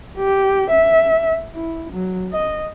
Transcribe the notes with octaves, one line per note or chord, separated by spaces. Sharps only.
G4
E5
E4
F#3
D#5